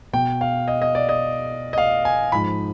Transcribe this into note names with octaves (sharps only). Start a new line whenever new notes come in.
B2 G5
F5
D#5
D#5
D5
D#5
D#5
F5
G#5
G#2 F3 B5